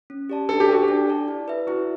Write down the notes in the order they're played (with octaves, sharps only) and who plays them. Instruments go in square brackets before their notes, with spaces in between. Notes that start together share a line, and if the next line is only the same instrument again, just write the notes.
[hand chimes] C#4
G4 D5 A5
[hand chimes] D4 [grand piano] A4
[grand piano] G4
[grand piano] F#4 [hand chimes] A4 D5 A5
[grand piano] G4
[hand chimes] D4
A4 D5 A5
E4
B4 E5
[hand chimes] E4 [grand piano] F#4